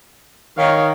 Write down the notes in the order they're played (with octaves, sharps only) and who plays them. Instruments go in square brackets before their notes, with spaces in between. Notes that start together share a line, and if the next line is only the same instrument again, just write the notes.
[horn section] D#3 [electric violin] C#5 F5